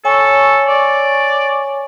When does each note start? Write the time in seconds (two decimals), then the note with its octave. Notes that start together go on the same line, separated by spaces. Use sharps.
0.05 A4 C#5 G#5 C#6
0.67 D5